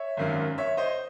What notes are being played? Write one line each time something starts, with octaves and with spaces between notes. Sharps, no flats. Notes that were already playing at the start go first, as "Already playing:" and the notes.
Already playing: C#5 E5
G#1 F#2 D#3 F#3
C#5 E5
C5 D#5